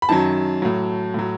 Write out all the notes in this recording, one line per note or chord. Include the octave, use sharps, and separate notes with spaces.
B5
F#2 D#3 F#3 A5
A2 F#3
A2 F#3